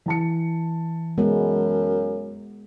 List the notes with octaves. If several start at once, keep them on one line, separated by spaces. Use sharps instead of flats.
E3 A5 C#7
F#2 G#3 B3